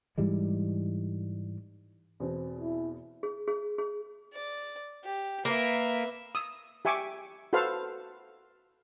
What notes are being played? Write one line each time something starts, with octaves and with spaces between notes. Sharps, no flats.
G#2 E3 G3 G#3
E2 B2 C4
E4
G#4
G#4
G#4
D5
G4
A#3 B4 E5
D#6 E6
G4 E5 G#5 C#6 D6
F#4 A4 B4 C5 F5